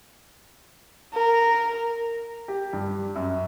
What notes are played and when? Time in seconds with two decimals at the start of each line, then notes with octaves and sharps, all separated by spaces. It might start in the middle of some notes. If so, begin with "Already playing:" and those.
1.14 A#4
2.48 G4
2.73 G2
3.16 F#2